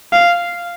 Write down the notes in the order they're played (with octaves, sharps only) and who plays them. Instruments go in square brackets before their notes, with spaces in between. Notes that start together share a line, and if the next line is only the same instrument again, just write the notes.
[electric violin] F5